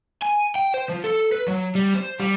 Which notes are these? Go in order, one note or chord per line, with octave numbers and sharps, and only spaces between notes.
G#5
G5
C5
F3
A4
B4
F#3
G3
C5
G3